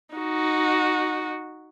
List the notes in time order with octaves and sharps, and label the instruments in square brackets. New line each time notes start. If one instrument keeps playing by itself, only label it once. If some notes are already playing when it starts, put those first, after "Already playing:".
[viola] D#4 F#4